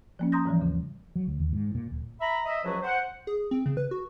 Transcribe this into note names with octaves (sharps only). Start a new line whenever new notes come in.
F3 A#3 C#4
A#5 C6 D#6 G6 A#6
G#2 E3 F3 G3
D#2 C#3
F#3
D2
D#2
G#2
A#2
D1
E5 A#5 B5
D#5 E5
C#2 F3 F#3 F#4 B4
C5 F#5
G#4
C4
C#3
B4
F#4